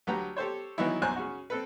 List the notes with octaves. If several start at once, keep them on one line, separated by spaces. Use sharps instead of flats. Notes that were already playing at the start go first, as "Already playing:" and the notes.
D2 F#3 G4 B4 F#5 A#5
G4 A4 C5 C#5
D#3 E3 F#3 B3 D#4 E4
B1 F#2 C5 G#5 A#5 F#6
C#3 C#4 F#4
C4 A4 B4